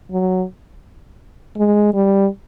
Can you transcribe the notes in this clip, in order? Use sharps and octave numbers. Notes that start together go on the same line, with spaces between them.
F#3
G#3
G3